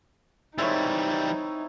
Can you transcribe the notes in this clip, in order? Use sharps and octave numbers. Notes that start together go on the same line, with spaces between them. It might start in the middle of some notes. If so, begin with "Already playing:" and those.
E3 G3 G#3 C4 D#4 E4 A#4 C#5